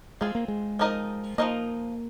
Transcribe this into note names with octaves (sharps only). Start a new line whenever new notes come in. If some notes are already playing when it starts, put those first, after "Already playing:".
G#3 C4 F4 G#4
A#3
G#3
F3 C4 D#4 A#4 D#5
F3 A#3 C4 D#4 A#4 D#5